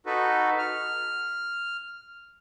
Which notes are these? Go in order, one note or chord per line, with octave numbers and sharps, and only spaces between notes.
D#4 F#4 A4 B4
F6